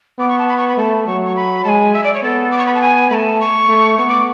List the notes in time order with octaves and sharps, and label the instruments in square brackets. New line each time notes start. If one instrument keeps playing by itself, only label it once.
[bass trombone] B3 [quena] D6
[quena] C#6
A5
B5
C#6
B5
[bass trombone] A3 [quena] A5
[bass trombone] F#3 [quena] C#6
[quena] C#6
B5
[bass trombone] G#3 [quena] G#5 A5
[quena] E5
D5
C#5
[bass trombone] B3 [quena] A4
[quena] D6
C#6
B5
A5
G#5
[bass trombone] A3 [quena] A5 B5
[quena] C#6
[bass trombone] A3
[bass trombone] B3 [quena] C#6
[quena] D6